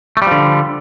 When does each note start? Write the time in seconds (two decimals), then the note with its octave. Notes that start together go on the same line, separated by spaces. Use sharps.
0.17 A3
0.22 G3
0.27 F3
0.31 D3